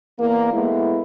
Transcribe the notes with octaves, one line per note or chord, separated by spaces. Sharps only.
E2 A#3
G#3 A3 B3 E4